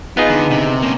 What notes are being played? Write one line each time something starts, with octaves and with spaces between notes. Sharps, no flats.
B3 D#4 F4 G#4
D3
C3
A#3 C#4